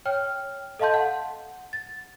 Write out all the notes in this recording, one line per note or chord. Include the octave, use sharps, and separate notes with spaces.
C#5 G5 F6
A4 D#5 F5 A5 C6 G6
F#5
A6